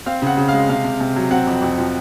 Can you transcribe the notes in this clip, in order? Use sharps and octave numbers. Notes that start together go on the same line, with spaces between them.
C4 F5
C#3 F#5
C#3
F5
G#3
C3 F5
C3
C3
F#3
C4 F#5
F2
F2
F3